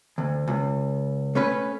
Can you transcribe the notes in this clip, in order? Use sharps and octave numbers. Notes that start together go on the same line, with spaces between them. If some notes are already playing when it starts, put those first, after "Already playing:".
D2
C#2
A3 C#4 B4